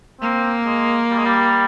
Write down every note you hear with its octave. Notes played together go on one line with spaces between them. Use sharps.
A#3 C4
G#3
G3
G#3
G3